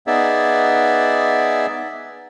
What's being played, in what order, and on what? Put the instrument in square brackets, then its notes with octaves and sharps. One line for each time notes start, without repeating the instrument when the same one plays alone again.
[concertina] B3 D#4 G#4 D5 E5